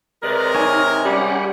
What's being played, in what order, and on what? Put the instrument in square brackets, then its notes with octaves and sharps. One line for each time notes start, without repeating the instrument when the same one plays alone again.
[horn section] C3 G#3 A#4 [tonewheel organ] B4 D5
[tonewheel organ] D#4 [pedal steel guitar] C#5 G#5
[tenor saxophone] G3 [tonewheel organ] C#4 G4 F#5